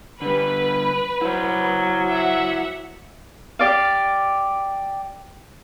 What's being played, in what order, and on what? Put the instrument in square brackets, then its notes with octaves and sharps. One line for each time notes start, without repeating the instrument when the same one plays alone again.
[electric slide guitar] D3 G3 [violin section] B4
[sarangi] F#3 [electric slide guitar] E4 C5
[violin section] E5 F#5
[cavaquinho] G4 D5 F5